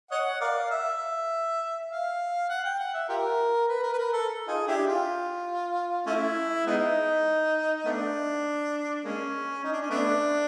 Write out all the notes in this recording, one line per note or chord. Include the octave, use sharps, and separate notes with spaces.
C#5 D#5 F#5
A#4 D5 F5
E5
F5
F#5
G5
F#5
E5
F4 G4 A#4
B4
A#4
B4
A#4
A4
D#4 F4 G#4
D4 E4 G4
F4
A3 C#4 E4
G#3 B3 D#4
A3 B3 D4
G#3 A#3 C#4
D#4
D4
C#4
A3 B3 D4